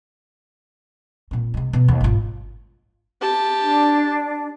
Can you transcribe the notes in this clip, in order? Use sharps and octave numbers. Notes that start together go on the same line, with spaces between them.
A#2 C4
C3 G#3
B2
D#2
G#1 F4
G4 A5
D4